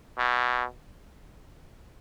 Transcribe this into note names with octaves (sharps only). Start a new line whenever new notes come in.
B2